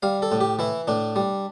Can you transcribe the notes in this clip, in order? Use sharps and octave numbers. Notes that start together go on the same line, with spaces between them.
G3 F5
A4
A2
G4
E3 E4
A2 D4
G3